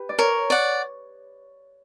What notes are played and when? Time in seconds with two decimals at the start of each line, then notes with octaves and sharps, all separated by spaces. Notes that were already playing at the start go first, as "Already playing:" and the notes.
Already playing: G4 B4
0.09 D5
0.19 A#4 C#5
0.50 D5 F#5